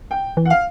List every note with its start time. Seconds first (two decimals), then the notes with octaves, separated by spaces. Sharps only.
0.11 G5
0.37 E3
0.45 F#5
0.50 F5